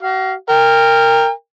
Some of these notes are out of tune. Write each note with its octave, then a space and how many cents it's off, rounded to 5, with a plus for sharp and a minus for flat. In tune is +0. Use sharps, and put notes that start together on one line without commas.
F#4 +35 F5 -10
A#4 -10 G5 +30